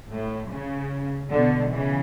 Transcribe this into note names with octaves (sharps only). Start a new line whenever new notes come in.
A2
C#3
B2 D3
C#3 E3